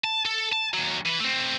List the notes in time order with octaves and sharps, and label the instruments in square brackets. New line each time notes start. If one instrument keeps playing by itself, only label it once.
[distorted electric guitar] A5
A4
A5
D#2 F#3
E3 B4
A3 C4